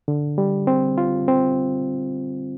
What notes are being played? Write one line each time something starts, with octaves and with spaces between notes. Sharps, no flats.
D3
G3
C4
F4
C4